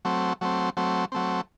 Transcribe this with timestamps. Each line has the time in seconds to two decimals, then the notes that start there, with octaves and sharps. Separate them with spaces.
0.05 F#3 A3 C4
0.41 F#3 A3 C4
0.77 F#3 A3 C4
1.12 F#3 A3 C4